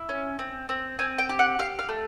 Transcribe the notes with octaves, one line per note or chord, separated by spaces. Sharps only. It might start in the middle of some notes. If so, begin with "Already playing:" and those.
Already playing: E4
C#4
C4
C4
C4 G#5
G5
G4
F#5
G4 F5
F5
A3